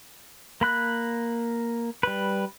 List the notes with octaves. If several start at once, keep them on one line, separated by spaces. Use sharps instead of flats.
A#3 B5 F#6
G3 B4